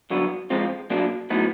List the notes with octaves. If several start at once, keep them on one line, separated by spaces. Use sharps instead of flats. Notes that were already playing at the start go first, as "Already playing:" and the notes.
G2 D3 F#3 B3
G#2 F3 G#3 C4 F4
B1 A#2 F#3 A#3 D4
A2 F#3 B3 D#4